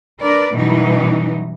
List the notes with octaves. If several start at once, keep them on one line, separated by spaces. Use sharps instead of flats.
D4 A#4 B4 D5
F#2 B2 E3 F#3 G3 D#4